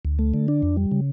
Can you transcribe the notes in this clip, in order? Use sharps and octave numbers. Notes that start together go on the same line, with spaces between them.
D2
A3
D3
D4
F2
G3
C#3